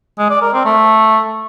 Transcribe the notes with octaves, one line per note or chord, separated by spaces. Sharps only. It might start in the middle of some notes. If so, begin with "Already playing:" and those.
G#3
D5
A#4
C4
A3